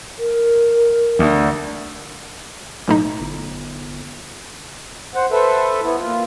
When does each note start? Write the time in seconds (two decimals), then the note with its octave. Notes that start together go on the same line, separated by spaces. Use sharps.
0.19 A#4
1.19 D2
2.88 B1 A2 D#4
3.20 G1
5.15 C5 F#5
5.31 A4 B4 C5 E5
5.83 B3 E4
5.98 A#2 F4